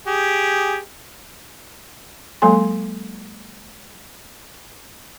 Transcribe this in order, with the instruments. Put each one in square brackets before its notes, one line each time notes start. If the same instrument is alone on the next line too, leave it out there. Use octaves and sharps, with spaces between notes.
[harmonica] G4 G#4
[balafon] F#3 G#3 A#3 A4 G#5 C6